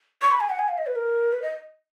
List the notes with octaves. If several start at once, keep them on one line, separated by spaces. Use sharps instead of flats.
C#6
B5
G#5
F#5
G#5
F5
D#5
B4
A#4
B4
D#5